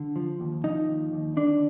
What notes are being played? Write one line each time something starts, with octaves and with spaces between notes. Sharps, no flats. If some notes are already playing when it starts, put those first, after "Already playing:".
Already playing: D3
F3
D#2
F3 D#4
D#2
D#2
D3 D4